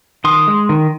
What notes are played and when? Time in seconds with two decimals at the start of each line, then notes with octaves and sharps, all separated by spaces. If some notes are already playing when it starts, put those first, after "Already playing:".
0.24 D#3 C6 D#6
0.47 G#3
0.69 D#3